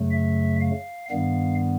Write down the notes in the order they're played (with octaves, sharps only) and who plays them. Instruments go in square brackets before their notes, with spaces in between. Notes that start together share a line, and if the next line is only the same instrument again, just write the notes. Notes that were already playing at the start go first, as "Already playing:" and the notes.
Already playing: [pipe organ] F#2 C#3 F#3 A3
E5
F5
G2 D#3 G3 B3 F5